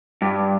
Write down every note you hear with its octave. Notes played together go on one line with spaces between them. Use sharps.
G2